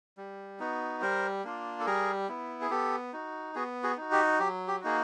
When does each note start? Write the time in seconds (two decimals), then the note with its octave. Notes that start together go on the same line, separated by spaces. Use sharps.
0.17 G3
0.60 B3 D#4 F#4
1.02 G3 A#4 C5
1.44 A#3 D4 F4
1.80 A4
1.86 G3 G#4 A#4
2.29 B3 E4
2.61 G#4
2.70 B3 G4 A4
3.13 D#4 F#4
3.55 B3 F#4 G#4
3.83 F#4 G#4
3.97 D#4 F#4
4.12 G4
4.40 F#3 G4
4.68 G4
4.81 A#3 D#4 F#4 G#4